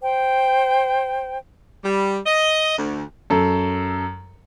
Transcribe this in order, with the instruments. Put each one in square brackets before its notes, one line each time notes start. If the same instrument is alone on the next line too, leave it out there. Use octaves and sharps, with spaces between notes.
[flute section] C5 G5
[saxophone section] G3
D#5
D2
[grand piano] F#2 A4